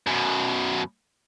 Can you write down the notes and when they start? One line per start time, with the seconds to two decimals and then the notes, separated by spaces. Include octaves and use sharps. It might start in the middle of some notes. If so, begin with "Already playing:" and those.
0.07 F#2 B2